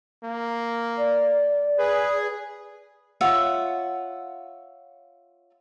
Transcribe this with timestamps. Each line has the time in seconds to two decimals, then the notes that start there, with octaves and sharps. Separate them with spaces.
0.24 A#3
0.97 D5
1.79 G#4 B4
3.21 F4 C#5 E5 F#5